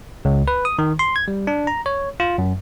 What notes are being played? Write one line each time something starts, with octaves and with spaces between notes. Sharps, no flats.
C#2
B4
D#6
D#3
C6
G#6
G3
D4
A#5
C#5
F4
F#2